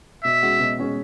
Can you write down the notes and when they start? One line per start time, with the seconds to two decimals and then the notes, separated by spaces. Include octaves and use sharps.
0.24 B2 E5
0.42 G#3 C#4 F#4
0.60 B2
0.78 G#3 C#4 F#4